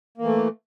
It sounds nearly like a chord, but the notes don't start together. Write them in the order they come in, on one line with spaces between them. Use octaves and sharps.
A#3 E3 A3